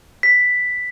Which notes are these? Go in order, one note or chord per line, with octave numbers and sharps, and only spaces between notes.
B6